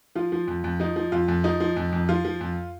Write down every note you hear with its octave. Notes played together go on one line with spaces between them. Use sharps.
F3 F4
F3
F2
F2
F3 D#4
F3
F2 F4
F2
F3 D#4
F3
F2
F2
F3 F4
F3
F2